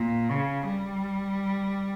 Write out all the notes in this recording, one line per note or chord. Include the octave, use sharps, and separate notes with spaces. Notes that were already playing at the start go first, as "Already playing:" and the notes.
Already playing: A#2
C#3
G3